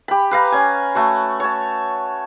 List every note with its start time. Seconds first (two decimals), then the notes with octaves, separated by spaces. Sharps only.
0.08 G4 B5
0.31 B4 F5 A#5
0.52 C#4 G#5
0.95 A3 F#4 C#6
1.40 C#5 A5